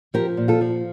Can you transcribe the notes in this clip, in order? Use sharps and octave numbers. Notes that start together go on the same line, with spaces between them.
F3 G4 A#4
A#2
F4 A4
F3